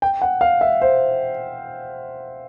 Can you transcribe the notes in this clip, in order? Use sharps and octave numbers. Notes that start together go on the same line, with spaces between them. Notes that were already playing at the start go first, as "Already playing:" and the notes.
G5
F#5
F5
E5
C5